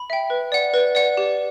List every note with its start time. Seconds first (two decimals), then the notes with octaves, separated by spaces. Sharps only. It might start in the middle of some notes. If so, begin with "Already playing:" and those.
Already playing: B5
0.10 E5 G5
0.30 B4
0.52 D5 F#5
0.74 B4
0.95 D5 F#5
1.17 G4